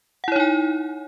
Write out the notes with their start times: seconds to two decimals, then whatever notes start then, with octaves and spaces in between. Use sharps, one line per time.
0.24 F#5
0.28 E4
0.32 C#5
0.36 D#4
0.40 G#5